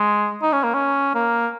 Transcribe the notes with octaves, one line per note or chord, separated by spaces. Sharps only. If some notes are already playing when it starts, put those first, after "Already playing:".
Already playing: G#3
D#4
C#4
A#3
C#4
A#3